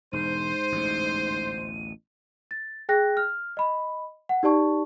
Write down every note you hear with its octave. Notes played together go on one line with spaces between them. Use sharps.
E1 G#2 C5 D#7
A1 D2 B2
A6
G#4 G5 F#6 A#6
F6
D#5 B5
F#5
D#4 G4 D5 A5 C#6